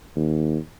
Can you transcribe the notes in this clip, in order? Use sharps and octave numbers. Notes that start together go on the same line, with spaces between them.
D#2